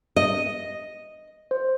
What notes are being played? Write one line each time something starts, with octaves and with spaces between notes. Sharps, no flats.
D#5
C5